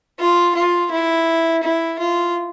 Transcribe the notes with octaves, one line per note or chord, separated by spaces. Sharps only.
F4
F4
E4
E4
F4